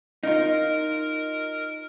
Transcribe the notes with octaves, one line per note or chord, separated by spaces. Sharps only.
D#4 F4 A#4